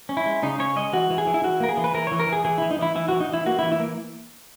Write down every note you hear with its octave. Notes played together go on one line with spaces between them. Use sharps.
C#4
E4
G#3
C#3 D#4
C#4 C#5
G#3 D#5
E3 F#4
E3
G#4
E3
E4
E3 F#4
A#3 A#4
G#4
E3
B4
E3 A#4
E3 C#5
A#4
E3 G#4
E3 G#4
E3 E4
D#4
E3 E4
E3 E4
E3 F#4
D#4
E3 E4
A#3 F#4
E3 E4
E4
A#3